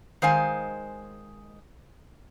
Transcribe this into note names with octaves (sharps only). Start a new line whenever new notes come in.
D#3 G#3 C5 F5 G#5